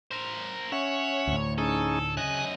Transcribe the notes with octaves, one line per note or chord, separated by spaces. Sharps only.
A#4 C5
C#4 C#5 E5 F#5
D2 A2
C#4 D#4 G#4 A4
F#2 C#3 D#5 G#5 F#6